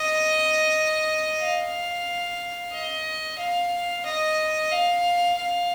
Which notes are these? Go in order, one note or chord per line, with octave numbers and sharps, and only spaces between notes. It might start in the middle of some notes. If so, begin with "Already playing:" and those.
Already playing: D#5
F5
D#5
F5
D#5
F5
F5